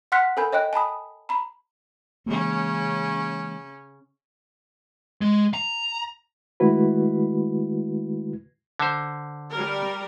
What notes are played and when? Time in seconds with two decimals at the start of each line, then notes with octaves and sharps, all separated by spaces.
0.12 F#5 C6 F6 F#6 B6 C#7
0.37 A4 A#4 G#5 B5 G6
0.53 C#5 D#5 G5 F#6
0.73 G#5 A5 B5 D#6
1.29 A#5 B5
2.26 C#3 E3 G#3 A#3 C#4
5.21 G#3
5.54 A#5
6.60 D#3 G#3 A3 E4 F#4 B4
8.79 D3 C5
9.51 G3 A#4